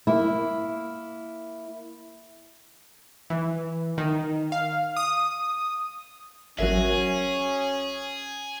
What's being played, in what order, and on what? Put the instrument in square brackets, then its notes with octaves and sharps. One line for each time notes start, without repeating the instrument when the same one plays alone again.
[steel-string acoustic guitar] A#3 E4
[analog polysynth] E3
D#3
F5
D#6
[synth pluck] G#1 F#3 [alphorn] C#4 [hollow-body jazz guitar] F#4 A#4 E5 [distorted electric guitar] G#4